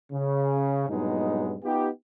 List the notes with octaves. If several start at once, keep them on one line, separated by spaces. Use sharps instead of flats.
C#3
G2 A#2 F#3 G#3 B3 D#4
B3 D#4 F4 G4